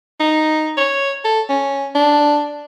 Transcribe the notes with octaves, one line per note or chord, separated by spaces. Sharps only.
D#4
C#5
A4
C#4
D4